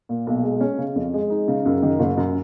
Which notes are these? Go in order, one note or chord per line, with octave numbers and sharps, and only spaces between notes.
A#2
B1
G#3
C#4
C#3
F2
G#3
D#4
C#3
F#2
D#3
F#1
F#2